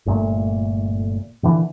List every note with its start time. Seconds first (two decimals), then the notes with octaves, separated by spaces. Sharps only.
0.06 G1 A#2 A3
1.43 A#2 D3 E3